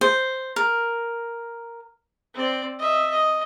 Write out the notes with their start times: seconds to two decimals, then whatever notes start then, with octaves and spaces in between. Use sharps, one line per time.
0.01 C5
0.56 A#4
2.34 C4 D5
2.79 D#5 E5
3.10 D#5